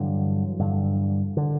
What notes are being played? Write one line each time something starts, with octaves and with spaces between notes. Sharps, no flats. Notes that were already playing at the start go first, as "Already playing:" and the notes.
Already playing: G2 D3 E3 F#3
G2 D3
D3